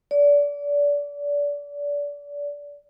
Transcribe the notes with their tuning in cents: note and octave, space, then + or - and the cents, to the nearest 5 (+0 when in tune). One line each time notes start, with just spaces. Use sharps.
D5 -30